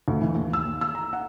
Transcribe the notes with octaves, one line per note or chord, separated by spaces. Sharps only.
D2
E3
D#2
E6
D#2
E6
A#5
F#5